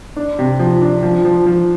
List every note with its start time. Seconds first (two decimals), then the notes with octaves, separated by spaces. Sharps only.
0.16 D4
0.39 C3
0.59 F3
0.81 D4
1.03 F3
1.25 F3
1.46 F3